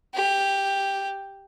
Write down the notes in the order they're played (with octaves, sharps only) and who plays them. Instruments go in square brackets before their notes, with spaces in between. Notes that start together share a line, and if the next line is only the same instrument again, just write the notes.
[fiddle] G4